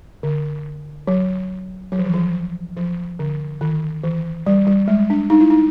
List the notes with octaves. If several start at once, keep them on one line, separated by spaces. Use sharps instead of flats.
D3
F#3
F#3
F3
E3
F3
F3
D3
D#3
E3
G3
G3
G#3
D4
D#4
E4
D#4